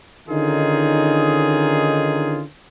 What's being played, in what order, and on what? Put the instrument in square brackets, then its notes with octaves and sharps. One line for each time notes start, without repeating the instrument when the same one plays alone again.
[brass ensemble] D3 D#3 C#4 D#4 F4 G#4